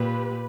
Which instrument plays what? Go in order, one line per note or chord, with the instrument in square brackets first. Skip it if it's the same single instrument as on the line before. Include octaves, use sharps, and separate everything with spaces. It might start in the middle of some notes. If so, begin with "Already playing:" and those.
Already playing: [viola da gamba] A#2 [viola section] G4 B4